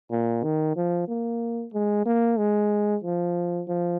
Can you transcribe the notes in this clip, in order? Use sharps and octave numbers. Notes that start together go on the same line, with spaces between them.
A#2
D#3
F3
A#3
G#3
A#3
G#3
F3
F3